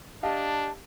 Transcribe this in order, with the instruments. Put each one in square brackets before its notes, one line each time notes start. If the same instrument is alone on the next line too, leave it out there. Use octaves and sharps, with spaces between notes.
[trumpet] D4 [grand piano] G4 D#5 F5 [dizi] A5